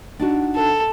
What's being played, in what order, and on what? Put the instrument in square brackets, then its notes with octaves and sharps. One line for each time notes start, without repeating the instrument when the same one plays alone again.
[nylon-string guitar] D4 D#4 F#4
[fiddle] A4